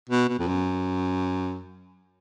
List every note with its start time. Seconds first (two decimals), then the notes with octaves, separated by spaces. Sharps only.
0.10 B2
0.29 B2
0.39 F2
0.48 F#2